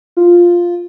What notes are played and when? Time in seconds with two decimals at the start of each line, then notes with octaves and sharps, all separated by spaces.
0.17 F4